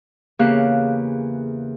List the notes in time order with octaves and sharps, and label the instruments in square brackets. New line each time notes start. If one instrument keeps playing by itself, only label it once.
[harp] E2 C#3 A#3 G4 F5 F#6